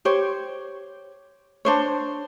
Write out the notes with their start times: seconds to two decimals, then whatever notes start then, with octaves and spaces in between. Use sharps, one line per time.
0.05 G4 C5 C#5
1.65 D4 C5 C#5